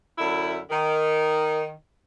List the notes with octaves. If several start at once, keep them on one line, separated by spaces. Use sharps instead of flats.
F#2 D3 E4
D#3